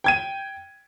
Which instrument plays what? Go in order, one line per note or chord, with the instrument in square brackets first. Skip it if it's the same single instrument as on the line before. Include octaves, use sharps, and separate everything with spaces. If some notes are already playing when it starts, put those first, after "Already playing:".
[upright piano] G5 G#6 D#7